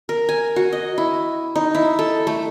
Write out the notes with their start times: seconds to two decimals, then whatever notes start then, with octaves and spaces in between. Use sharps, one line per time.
0.09 A#4
0.29 G#5
0.56 F#4
0.73 D#5
0.98 E4
1.56 D#4
1.75 E4
1.99 A4
2.27 A3